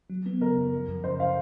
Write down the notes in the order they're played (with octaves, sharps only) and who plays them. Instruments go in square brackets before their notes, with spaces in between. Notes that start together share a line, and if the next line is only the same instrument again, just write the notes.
[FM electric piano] F#3
B3
[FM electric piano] C#3 [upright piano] A#4
[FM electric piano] F#2
F3
F#2
[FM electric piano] C#3 [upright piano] C5
[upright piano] F5